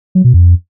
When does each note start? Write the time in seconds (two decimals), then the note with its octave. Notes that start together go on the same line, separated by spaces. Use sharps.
0.15 F#3
0.24 B2
0.34 F2